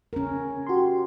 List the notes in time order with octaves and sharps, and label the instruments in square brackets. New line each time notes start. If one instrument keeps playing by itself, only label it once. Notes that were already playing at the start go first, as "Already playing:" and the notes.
[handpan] C#4 A#4
[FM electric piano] F#4 C6 [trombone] G4